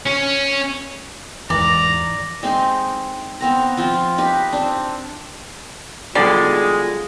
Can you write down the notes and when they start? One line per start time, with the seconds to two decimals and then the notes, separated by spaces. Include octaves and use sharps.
0.05 C#4
1.50 E1 G#2 E3 D5 A#5
2.43 G#3 C4 D#4 C6
3.41 B3 C4 A#5
3.77 F3 C4 F4
4.18 D#4 G4 B4
4.53 C4 D4
6.15 B1 D3 G3 G#3 F4 G#4 D5